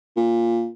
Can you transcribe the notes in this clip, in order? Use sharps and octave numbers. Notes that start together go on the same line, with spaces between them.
A#2